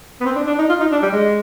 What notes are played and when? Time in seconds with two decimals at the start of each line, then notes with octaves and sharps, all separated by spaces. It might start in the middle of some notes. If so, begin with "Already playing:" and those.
0.21 B3
0.25 C4
0.36 D4
0.47 D4
0.59 D#4
0.69 F4
0.81 D#4
0.92 D4
1.03 G3
1.13 G#3